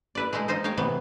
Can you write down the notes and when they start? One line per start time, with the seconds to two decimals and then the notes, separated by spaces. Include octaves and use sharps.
0.15 E4 B4 D5
0.33 G#3 A3 D#4 E4 G#4
0.48 D#4 F4 C5 D#5
0.64 D#4 C#5 F5 G5
0.77 C3 E3 F#3 B3